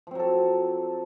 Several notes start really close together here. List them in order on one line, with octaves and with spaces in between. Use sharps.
F3 C4 F#3 A4